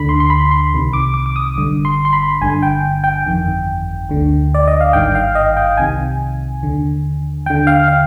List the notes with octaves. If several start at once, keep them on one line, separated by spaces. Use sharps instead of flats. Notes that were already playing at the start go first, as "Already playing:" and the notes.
Already playing: D2 D3 B5
C6
C6
B5
C6
C2 C3 D#3
D6
D6
D6
D#6
G1 G2 D3
C6
C6
B5
G1 G2 D3 G#5
G5
G5
G1 F2 D#3
D2 D3
D5
D#5
F5
G#1 G2 D#3 G5
F5
D#5
G5
C2 C3 D#3 G#5
D#2 D3
D#2 D3 G5
F5
F5